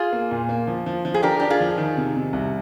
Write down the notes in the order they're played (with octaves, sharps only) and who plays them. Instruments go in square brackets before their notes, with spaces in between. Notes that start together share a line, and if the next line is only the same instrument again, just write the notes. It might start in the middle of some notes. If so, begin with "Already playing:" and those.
Already playing: [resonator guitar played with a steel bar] F4 G#4
[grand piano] A#3
A#2
A#3
F3
F3
F3
[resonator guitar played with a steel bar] G#4
[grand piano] D4 [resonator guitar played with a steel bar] G4 A#4
[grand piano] D4 [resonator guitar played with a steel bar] G4
[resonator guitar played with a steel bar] F4 G#4
[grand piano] F3
D#3
C3
C3
C2